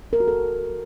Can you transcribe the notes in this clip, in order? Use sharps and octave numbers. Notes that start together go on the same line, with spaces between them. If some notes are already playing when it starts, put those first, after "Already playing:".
A#4
F#4
A4